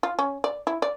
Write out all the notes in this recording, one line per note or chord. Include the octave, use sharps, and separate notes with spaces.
F4
C#4
D5
E4
D5